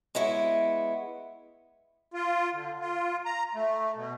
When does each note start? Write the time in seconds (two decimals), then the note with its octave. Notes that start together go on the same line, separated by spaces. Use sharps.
0.15 G#3 B3 E4 C#5
2.14 F4
2.54 D3
2.81 F4
3.25 A#5
3.55 A3
3.96 B2